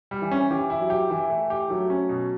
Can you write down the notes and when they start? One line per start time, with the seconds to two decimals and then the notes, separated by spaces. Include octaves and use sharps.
0.11 G3
0.22 E3
0.31 C#4
0.51 E3 G4
0.70 E4
0.80 F#3
0.90 G4
1.10 E3 E4
1.30 A3
1.50 G4
1.70 F#3 A3
1.90 C#4
2.09 B2